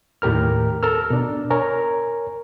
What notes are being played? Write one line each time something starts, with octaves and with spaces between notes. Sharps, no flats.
D#2 A2 G4 A#4 F6
A4 A#4 E6 F6
B2 D4
A#4 C#5 G#5